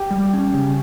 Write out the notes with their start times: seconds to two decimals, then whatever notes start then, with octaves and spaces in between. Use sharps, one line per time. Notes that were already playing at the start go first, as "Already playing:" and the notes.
Already playing: G4 G5
0.11 G3
0.33 C#4
0.54 C#3